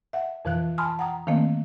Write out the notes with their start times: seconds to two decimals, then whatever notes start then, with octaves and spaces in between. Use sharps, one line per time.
0.13 E5 F#5
0.45 F2 B2 E3 F3 F#6
0.78 G#5 A5 B5 C6 D#6 F6
0.99 F#5 G5 A#5 D#6
1.27 D#3 F3 A3 A#3 C4